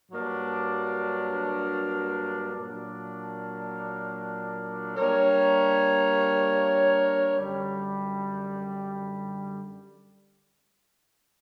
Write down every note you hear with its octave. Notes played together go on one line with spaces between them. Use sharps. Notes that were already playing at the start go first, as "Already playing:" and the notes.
G2 F#3 A#3 D4
A#2 F#3 A#3 D4
G3 A#3 D4 A#4 C#5
F#2 D3 G3